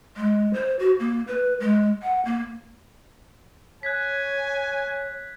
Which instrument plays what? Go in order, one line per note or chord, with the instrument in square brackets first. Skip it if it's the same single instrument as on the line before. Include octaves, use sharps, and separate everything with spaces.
[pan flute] G#3
C5
F#4
A#3
B4
G#3
F#5
A#3
[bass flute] C#5 [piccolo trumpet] G#5 [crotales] F#6 G#6 B6